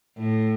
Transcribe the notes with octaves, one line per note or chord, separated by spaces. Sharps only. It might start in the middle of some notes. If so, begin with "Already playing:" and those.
A2